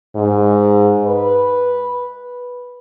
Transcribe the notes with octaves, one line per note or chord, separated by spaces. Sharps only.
G#2
B4